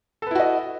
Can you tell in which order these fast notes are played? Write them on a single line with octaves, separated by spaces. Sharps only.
A4 B4 E4 F#4 D#5